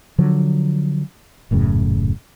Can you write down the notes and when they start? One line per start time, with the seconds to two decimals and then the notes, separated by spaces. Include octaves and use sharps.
0.18 D3 F3 F#3
1.51 D#1 F#2 A2 C#3